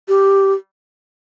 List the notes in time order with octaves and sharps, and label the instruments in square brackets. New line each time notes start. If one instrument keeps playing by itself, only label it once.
[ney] G4